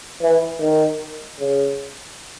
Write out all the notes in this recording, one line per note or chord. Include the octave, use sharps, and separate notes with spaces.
E3
D#3
C#3